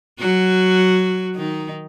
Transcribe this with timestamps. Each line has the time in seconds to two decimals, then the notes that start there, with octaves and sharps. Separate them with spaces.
0.19 F#3 F#4
1.35 D#3 D#4